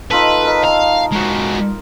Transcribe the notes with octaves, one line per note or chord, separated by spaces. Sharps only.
D#4 F4 A4 B4
A4 A#4 D#5
A#4 F5 A5
G#3 F#4